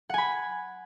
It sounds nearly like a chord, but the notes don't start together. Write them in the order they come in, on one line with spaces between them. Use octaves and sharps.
F#5 G#5 B5